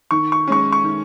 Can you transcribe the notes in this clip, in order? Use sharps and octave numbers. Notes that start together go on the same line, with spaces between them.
D#3 C#6
C#6
G#3 C#4 C#6
C#6
D#3